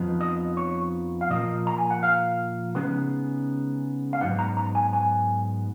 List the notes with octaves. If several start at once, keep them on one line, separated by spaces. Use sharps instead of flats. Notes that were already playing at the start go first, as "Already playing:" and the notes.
Already playing: F2 F3 B3 D#4
D#5
C#5
F5
A#2 F3 A#3 D#5
A#5
G#5
F#5
F5
C#3 G#3 B3 D#4
F5
G#2 F#3 B3 D#4 F#5
A#5
A#5
G#5
G#5